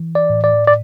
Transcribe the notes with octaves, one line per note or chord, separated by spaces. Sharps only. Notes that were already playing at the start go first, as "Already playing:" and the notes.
Already playing: E3
D5
A2
D5
D5